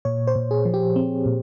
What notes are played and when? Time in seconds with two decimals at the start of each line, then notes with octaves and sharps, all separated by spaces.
0.05 A#2 C#5
0.27 C5
0.35 A#2
0.51 G#4
0.65 F3
0.74 G4
0.96 C4
1.26 A#2